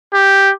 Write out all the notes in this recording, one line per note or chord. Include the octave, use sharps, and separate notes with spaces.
G4